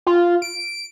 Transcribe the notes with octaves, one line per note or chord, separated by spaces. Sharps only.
F4
D7